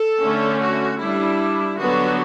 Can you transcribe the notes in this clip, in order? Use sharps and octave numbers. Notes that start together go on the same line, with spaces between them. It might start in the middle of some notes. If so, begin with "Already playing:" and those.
Already playing: A4
D3 A3 C#4
F#4
G3 D4 E4
D3 F#3 B3 D4 F#4